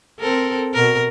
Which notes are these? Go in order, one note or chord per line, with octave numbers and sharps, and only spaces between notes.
C4 A4 A#4
B2 A#4